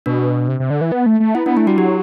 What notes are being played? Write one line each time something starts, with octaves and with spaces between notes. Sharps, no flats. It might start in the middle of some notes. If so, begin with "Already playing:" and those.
B2 D4
C3
C3
D3
E3
B3
A3
A3
B3 E4
B3 D4
A3 E4
G3 F#4
F#3 G4